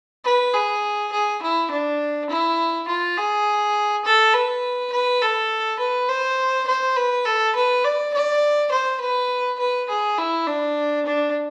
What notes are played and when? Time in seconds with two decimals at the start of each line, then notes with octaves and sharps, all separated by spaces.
0.25 B4
0.54 G#4
1.12 G#4
1.42 E4
1.70 D4
2.30 E4
2.88 F4
3.17 G#4
4.05 A4
4.34 B4
4.92 B4
5.21 A4
5.79 B4
6.09 C5
6.67 C5
6.96 B4
7.25 A4
7.55 B4
7.84 D5
8.14 D5
8.71 C5
9.01 B4
9.59 B4
9.89 G#4
10.18 E4
10.47 D4
11.05 D4